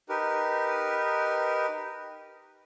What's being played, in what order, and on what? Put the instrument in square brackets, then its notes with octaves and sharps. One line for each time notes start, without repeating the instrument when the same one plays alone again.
[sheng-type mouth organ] D#4 G4 A#4 B4